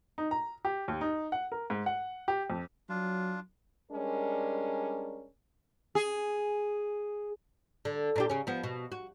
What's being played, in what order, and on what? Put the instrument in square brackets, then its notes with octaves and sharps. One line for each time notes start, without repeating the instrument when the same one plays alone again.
[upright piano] D#4
A#5
G4
D#2
D#4
F#5
A#4
G#2
F#5
G4
F2
[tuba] F#3 [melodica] D4 F4
[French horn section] G3 G#3 C#4 D4 A#4
[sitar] G#4
[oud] D3
A#2 D4 G4
C#3 C#4
F3 B3
B2
F#4